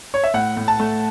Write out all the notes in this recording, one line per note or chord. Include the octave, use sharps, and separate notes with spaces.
C#5
E5
A2 F#5
A2
A5
A3